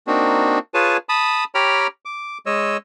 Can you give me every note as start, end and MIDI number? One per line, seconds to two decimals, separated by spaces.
0.07 0.59 58
0.07 0.59 60
0.07 0.59 62
0.07 0.59 63
0.07 0.59 66
0.74 0.97 65
0.74 0.97 68
0.74 0.97 71
0.74 0.97 73
0.74 0.97 80
0.74 0.97 81
1.09 1.44 81
1.09 1.44 83
1.09 1.44 87
1.55 1.87 67
1.55 1.87 73
1.55 1.87 79
1.55 1.87 82
1.55 1.87 83
1.55 1.87 89
2.05 2.38 86
2.46 2.77 56
2.46 2.77 73
2.46 2.77 75
2.46 2.77 88